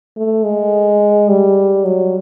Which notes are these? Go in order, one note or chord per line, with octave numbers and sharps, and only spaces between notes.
A3
G#3
G3
F#3